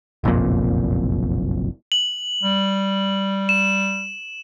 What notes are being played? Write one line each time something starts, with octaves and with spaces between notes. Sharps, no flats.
F#1 B1 F2 A#2
F#7
G3
E7